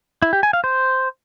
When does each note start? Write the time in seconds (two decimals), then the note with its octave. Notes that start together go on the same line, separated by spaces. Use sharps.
0.22 E4
0.33 G4
0.43 G#5
0.53 F5
0.64 C5